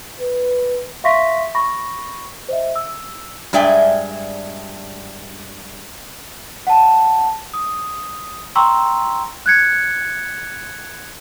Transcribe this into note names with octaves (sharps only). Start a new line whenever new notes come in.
B4
E5 F5 C6 C#6 A#6 B6
B5 C#6 A#6
C5 D#5 E5
E6
G2 G#3 D5 E5 G5 G#5
F#5 A5
D#6
G5 A#5 C6 C#6 E6
F#6 G#6 C#7